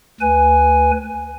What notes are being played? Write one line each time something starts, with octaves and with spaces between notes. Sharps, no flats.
D2 B4 G#5